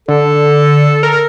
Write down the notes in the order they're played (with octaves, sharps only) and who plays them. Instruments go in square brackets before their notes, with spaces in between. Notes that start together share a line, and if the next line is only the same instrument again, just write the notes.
[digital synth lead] D3 [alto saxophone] A4
[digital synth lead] A#4